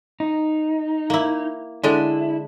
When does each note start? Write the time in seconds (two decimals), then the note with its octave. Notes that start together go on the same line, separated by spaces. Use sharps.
0.20 D#4
1.10 A#3 E4
1.83 D3 G#3 D4 E4